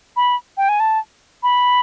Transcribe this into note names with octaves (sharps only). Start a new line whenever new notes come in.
B5
G5
G#5
A5
B5